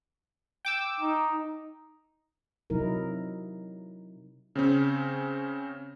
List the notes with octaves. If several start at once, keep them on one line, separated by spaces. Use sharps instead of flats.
G5 D6 E6
D#4
C3 F#3 D#4 E4 A#4
C#3 C4 C#4